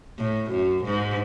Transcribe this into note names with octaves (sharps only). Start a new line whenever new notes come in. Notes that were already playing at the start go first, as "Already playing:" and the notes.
A2
F#2
G#2